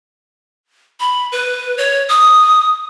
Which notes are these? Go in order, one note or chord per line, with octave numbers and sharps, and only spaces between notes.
B5
B4
C#5
D#6